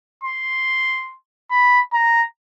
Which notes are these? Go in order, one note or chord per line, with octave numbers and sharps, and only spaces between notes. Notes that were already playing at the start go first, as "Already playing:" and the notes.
C6
B5
A#5